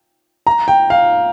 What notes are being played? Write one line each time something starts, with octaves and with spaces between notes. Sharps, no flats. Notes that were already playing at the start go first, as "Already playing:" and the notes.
A#5
G5
F5